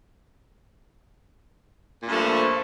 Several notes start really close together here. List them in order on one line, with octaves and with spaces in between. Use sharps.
A#2 G2 A3 F3